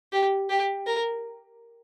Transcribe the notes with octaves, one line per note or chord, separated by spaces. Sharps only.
G4
G4
A#4